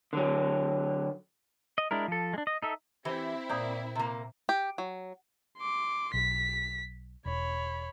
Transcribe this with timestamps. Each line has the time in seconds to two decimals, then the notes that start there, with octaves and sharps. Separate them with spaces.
0.13 D3 F#3
1.78 D#5
1.91 G#3 D4 E4 A#4
2.08 F3 A4
2.33 G#3 D4
2.47 D#5
2.63 D#4 A4 E5
3.05 E3 C4 E4 G4
3.49 A#2 A#3 D5 D#6 G6
3.95 C3 A#3
4.49 G4
4.78 F#3
5.58 C6 D6
6.14 B1 B6
7.26 E1 C#5 B5